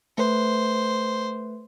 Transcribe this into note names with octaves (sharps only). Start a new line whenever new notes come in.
A3 B4 C5